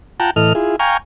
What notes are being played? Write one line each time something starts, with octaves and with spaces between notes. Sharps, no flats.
F4 F#5 G5 A5 A#5
A2 E3 A4 D#5 F6
E4 F4 G#4
F5 G5 G#5 A#5 C#6